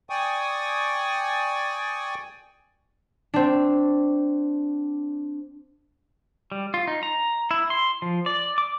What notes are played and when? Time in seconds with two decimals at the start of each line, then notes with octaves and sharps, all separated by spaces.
0.10 D5 G5 G#5 C#6 D#6
3.34 C4 D4
6.52 G3
6.74 F4
6.88 D#4
7.03 A#5
7.51 E4
7.70 C6
8.02 F3
8.26 D5
8.58 D6